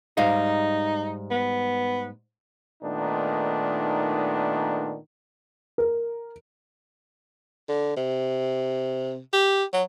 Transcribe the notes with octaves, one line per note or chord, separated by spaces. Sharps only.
G#2 G3 D#4 F5
B3
A#2 D#3 A3 B3 D4 D#4
A#4
D3
C3
G4
F#3